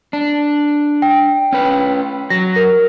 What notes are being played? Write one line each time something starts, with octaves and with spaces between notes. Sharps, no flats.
D4
G5
C#4 B4
F#3 A#6
A#4